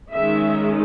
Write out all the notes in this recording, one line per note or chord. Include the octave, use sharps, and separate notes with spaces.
D#3 G#3 C#4 E5